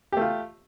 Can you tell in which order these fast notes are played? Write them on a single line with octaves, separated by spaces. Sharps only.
G4 A3 F4